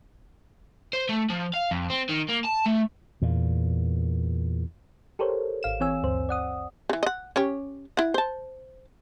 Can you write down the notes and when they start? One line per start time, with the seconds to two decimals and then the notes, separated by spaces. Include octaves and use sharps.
0.93 C5
1.09 A3
1.30 F3
1.54 F5
1.71 F2
1.90 C4
2.09 D#3
2.29 A#3
2.44 A5
2.66 A3
3.22 E2 A#2
5.19 G4 A4 A#4 C5 C#5
5.63 G#1 F5 E7
5.80 E3 C4 C#5 G#5 E6
6.03 D2 G2 C5
6.29 D5 F#5 D#6
6.89 C#3 E3
7.03 D#5 F#5
7.36 C#4 G4 C#5
7.97 E4 F#5
8.14 C5 A5